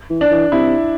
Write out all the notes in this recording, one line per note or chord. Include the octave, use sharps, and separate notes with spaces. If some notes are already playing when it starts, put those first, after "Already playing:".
E3
D4
E3
C3 E4